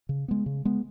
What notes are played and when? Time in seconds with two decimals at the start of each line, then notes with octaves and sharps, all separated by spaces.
0.09 C#3
0.28 G#3 B3
0.46 C#3
0.65 G#3 B3